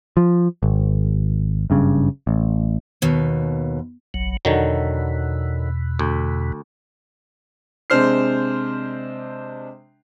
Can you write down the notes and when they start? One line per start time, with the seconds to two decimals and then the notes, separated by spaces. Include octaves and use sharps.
0.17 F3
0.63 G#1
1.70 F#1 G2 C#3
2.27 A1
3.02 D#2 B2
4.14 F#1 B1 F#3
4.45 E2 B2 D3 D#3 F#3
5.99 D2
7.90 C3 G#3 D4 C5 F6 C7